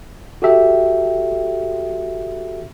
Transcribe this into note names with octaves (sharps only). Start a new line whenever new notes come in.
F#4 G4 A4 E5 G5